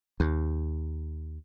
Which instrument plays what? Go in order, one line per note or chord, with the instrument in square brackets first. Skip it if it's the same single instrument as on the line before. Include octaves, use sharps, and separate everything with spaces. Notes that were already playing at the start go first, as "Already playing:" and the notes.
[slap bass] D#2